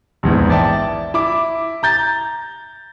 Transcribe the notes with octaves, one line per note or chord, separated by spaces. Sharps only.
A#1 E2 G#2
D5 E5 G5 A5
E4 D6
A#5 G6 A6